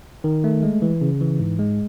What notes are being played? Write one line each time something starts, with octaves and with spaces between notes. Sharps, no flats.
D#3
A3
G#3
E3
C#3
E3
G#2
G#3